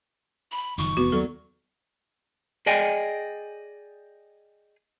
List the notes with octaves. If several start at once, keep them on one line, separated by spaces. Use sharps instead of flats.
B5
F#1 D#3 F3 C#6
F1 E2 B3 F#4
D#2 F#3 A4 D5
G#4 D5 D#5 G5 G#5